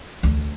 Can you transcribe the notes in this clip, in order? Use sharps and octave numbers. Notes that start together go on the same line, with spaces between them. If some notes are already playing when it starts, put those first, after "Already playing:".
D2